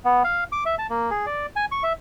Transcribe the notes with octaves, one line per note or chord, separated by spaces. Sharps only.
B3
F5
D6
E5
A5
A#3
G#4
D5
G#5
C#6
E5